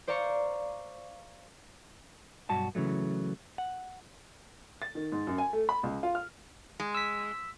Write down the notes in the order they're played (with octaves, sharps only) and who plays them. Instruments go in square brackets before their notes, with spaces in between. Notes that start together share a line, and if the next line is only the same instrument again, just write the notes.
[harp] C5 D5 F5 A#5 C#6
[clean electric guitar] B1 G2 F#4 A5
C#3 E3 F#3 A3
F#5
[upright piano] A6
D#3
G#2
F#2
G#5
A3
B5
C#2
F4
F6
[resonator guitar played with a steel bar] G#3
[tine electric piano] E6 B6